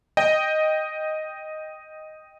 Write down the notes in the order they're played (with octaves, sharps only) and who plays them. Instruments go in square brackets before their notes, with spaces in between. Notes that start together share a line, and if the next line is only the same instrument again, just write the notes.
[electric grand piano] D#5 G5